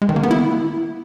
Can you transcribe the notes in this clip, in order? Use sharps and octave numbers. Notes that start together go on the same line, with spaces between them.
G#3
D#3
A#3
B3
E4